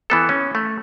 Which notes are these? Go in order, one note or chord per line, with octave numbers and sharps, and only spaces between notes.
E3 B3 A4
C#4
A3